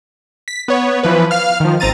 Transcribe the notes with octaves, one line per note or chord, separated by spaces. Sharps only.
B6
B3 C#5
E3 F3 B4
F5 F6
D#3 F3
G#1 C4 A#5 A6 D#7